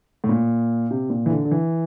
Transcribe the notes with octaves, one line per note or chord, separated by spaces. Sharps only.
A2
A#2
C3
A#2
E3
D3
D3
E3